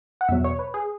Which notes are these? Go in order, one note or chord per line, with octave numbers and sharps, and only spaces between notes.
F#5
E2 B2 F#3 E5
C#5
B4
G#4